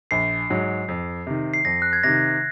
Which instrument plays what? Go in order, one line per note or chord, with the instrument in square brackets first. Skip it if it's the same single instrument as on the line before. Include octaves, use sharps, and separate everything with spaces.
[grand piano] A#1 [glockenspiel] C7
[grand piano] G#2 F#3
F2
C3 D#3
[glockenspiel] C7
[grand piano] F2 [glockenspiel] A#6
[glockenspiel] F#6
G#6
[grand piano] C3 D#3 [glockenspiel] A#6